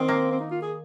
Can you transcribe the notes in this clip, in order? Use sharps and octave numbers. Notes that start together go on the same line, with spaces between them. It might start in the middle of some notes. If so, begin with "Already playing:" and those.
Already playing: D#3 C4
A#3
C4
D#4
F4
G#4